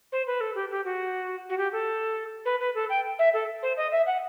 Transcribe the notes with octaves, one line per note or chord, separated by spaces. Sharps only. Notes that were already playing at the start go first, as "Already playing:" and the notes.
C5
B4
A4
G4
G4
F#4
F#4
G4
A4
B4
B4
A4
G5
E5
A4
C5
D#5
E5
F#5